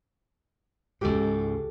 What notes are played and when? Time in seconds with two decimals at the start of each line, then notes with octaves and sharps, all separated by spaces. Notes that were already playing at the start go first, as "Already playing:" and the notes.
1.01 C#2 G#2 G4 A4